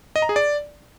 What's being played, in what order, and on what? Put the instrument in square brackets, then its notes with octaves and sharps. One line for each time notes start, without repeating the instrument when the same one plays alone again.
[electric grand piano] D#5
A#5
G#4
D5